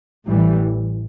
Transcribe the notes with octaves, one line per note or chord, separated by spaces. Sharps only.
A1 A2 E3 G3